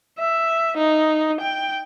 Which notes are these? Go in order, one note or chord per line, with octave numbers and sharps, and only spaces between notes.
E5
D#4
G5